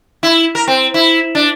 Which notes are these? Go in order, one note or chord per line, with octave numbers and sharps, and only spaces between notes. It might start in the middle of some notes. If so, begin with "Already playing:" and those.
E4
A#4
C4
E4
D4